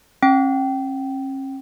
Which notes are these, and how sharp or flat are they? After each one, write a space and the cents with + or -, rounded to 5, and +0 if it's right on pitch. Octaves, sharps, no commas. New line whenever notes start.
C#4 -45 G5 -20